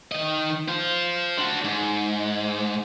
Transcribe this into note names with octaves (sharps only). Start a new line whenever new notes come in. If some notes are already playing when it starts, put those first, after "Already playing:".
D#3 D#5
F4 C5
D4 F#4
G#2